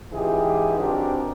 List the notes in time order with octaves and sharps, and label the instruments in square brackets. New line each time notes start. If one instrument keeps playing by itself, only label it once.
[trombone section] C#2 G#2 E3 G4 G#4
C4 D4 F#4 G4 A#4